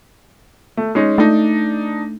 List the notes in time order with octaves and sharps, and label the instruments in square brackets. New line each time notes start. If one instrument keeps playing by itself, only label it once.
[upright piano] A3
G#3 C#4 D#4
[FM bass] A3 [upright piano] D4 D#4